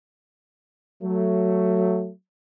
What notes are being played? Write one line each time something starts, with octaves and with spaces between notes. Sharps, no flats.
F#3 A3